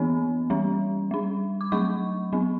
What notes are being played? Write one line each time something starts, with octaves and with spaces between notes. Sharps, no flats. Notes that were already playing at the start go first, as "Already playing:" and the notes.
Already playing: E3 B3 D4
E3 G3 C#4
G3 D4
D6
F#3 A3 D4 C#6
F#3 B3 D4